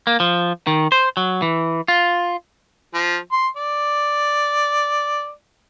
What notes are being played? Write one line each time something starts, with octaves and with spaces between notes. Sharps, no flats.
A#3
F3
D#3
C5
F#3
E3
F4
F3
C6
D5